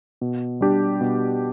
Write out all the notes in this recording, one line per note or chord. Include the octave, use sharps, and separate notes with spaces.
B2
G3 D4 G4
B2